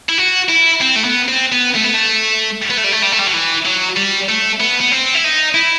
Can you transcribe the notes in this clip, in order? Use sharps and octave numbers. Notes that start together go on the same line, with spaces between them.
E4
F#4
E4
C4
A3
B3
C4
B3
A3
B3
A3
B3
A3
G3
A3
G3
A3
G3
F#3
E3
F#3
G3
A3
B3
B3
C4
E4
D#4
E4